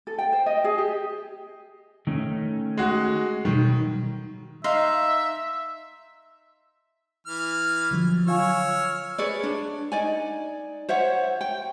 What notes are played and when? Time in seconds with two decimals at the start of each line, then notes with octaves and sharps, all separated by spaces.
0.07 A4
0.18 G5
0.33 C5
0.46 D#5
0.64 G#4
0.78 G4
2.07 D#3 A3 C#4
2.77 G#3 F#4
3.45 B2 D#3 F#3 G3
4.64 D#4 E5 F5 C6
7.27 E3 F6
7.91 D3 F3 F#3
8.27 F4 C#5 F5 G#5 E6 F6
9.18 G#4 B4 C#5 D5
9.43 D4
9.92 D#4 D5 G#5
10.89 C5 C#5 E5 F#5
11.41 G5